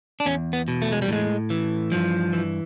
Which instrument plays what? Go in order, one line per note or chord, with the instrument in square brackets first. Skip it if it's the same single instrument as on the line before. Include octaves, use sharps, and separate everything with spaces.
[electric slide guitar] D4
E2 C#4
B3
B2
A3
G#3
G3
A2 G#3
E3
G2 F3
E3